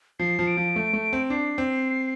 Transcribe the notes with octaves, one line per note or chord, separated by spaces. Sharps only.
F3 C7
F3
D7
F3
A3
A3
C4
D4 C7
C4